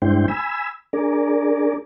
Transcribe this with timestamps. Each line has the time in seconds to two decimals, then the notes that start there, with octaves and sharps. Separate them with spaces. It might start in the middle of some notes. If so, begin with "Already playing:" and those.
0.02 G2 G#3 D4 E4 C5 G5
0.28 G#5 B5 E6
0.93 D4 G#4 A#4 D5